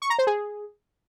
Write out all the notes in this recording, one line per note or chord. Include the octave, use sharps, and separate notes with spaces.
C#6
A#5
C5
G#4